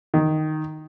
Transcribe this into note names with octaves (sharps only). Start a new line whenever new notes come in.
D#3